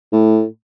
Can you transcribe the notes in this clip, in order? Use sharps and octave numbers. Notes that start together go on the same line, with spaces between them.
A2